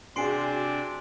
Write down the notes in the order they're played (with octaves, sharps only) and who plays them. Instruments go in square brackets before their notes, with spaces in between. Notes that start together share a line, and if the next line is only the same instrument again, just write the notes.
[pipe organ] C3 D4 [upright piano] F#4 G#4 [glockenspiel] C6 C7 D7